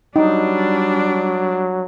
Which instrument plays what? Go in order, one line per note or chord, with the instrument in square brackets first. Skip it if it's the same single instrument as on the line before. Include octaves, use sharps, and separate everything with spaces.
[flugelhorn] F#3 [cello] G3 D4 [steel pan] D#4